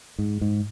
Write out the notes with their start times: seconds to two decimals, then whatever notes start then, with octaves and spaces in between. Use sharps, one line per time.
0.19 G#2
0.41 G#2